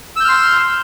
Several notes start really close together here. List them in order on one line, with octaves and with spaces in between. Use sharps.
E6 G6 F6 C6